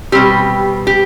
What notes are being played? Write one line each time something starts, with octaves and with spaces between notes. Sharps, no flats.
B2 G3 C4 G4
G4